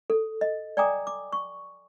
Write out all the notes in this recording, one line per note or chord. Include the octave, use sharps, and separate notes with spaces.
A4
D#5
D5 G5 G#5 A#5 D6 D#6
D6
C#6